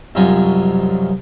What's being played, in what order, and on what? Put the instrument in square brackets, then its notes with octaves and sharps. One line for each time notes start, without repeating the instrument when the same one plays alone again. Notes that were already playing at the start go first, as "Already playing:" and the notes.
[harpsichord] C2 F#2 F3 D#4 C#5 G#5